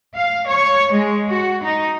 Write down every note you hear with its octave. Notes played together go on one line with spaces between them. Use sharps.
F5
C#5
G#3
F#4
D#4